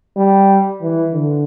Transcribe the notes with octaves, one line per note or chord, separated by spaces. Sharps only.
G3
E3
D3